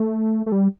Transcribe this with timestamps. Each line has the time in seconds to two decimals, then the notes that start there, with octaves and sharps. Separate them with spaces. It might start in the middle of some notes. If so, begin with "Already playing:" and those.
Already playing: A3
0.46 A3
0.52 G3